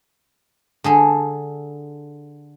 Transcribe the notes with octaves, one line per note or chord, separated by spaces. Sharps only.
D3 G#4 A4